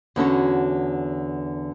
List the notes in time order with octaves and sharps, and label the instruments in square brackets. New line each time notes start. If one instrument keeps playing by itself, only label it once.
[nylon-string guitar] E2 D3 C#4 F#4